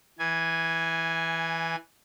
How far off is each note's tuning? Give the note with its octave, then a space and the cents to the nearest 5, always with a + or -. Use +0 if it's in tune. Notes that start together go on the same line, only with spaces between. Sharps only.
E3 -5 G#5 +0